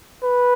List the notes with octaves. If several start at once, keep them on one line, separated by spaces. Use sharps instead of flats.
B4